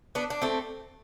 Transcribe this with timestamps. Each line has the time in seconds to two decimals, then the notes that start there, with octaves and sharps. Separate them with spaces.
0.15 B3 D4
0.30 D4
0.42 A3 C4